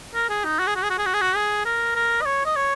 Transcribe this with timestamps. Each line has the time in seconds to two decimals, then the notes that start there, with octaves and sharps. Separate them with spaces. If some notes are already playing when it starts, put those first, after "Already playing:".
0.15 A#4
0.30 G#4
0.45 D#4
0.59 F#4
0.67 G#4
0.76 F#4
0.83 G#4
0.90 F#4
0.98 G#4
1.06 F#4
1.14 G#4
1.21 F#4
1.36 G#4
1.65 A#4
1.96 A#4
2.22 D#5
2.26 C#5
2.46 D#5
2.56 C#5